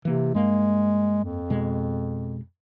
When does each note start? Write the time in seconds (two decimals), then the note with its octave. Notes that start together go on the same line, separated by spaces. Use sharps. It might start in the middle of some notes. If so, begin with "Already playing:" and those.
0.05 C3 E3 A#3
0.35 G2 G#3 A#3
1.24 F2
1.50 B2 G#3